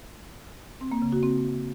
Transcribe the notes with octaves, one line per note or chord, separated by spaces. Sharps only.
C4
A#3
C#3
F#4
C4